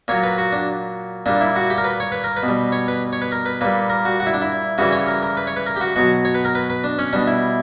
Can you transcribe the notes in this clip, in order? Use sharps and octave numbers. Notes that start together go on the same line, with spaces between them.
A#2 F#3 C#5
B4
F#4
D4
A#2 G3 D4
E4
F#4
G4
A#4
B4
C#5
B4
A#4
B4
B2
G3
C#5
B4
C#5
B4
A#4
B4
A#2 G3 B4
A#4
F#4
F#4
E4
D4
E4
C#3 E3 G3 F#4
C#5
A#4
A#4
B4
C#5
B4
A#4
G4
F#4
B2 F#3 F#4
C#5
B4
A#4
B4
B4
D4
C#4
B2 G3 D4
E4